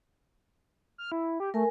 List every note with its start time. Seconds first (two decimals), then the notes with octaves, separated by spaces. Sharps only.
0.98 F6
1.12 E4
1.40 G4
1.54 A3 A#4 G#5